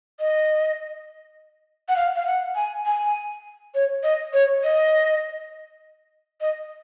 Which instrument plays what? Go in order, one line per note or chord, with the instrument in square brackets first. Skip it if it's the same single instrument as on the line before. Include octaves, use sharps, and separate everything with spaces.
[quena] D#5
F#5
F5
F5
F#5
G#5
G#5
C#5
D#5
C#5
D#5
D#5